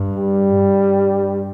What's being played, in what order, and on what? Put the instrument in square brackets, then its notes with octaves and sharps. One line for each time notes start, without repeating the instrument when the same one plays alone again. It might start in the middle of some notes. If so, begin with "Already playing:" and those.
Already playing: [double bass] G2
[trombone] G3
[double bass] G2